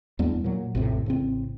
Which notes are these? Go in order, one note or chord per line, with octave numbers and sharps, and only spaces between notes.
E2 G3 B3 D4
A#2 F#3
A1 F2 A2 C3
A1 C#3 C4